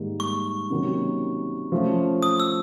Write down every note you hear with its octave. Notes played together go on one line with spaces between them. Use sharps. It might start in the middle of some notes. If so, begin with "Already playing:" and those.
Already playing: G#2 D#3 G3 A#3
C#6
C3 D#3 F#3 A#3 C#4
F3 A3 C#4
D#6
E6